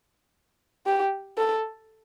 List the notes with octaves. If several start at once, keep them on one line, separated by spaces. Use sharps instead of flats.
G4
A4